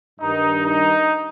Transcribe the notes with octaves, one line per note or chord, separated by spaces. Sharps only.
G2 D#3 D#4
D#4